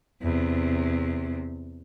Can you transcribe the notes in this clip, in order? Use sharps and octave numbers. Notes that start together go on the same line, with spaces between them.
E2 C3